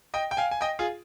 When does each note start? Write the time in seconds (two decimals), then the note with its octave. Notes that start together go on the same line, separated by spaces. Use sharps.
0.14 D#5 G5
0.31 G5
0.37 F5 G#5
0.51 G#5
0.61 D#5 G5
0.79 F4 G#4